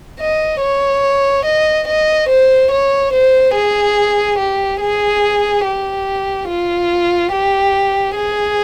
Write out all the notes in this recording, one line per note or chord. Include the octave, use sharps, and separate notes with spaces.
D#5
C#5
D#5
D#5
C5
C#5
C5
G#4
G4
G#4
G4
F4
G4
G#4